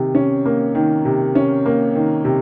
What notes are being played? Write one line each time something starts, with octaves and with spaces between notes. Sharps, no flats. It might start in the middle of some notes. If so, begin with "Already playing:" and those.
Already playing: C3 D#3
C#4
A#3
D#3
C3
C#4
A#3
D#3
C3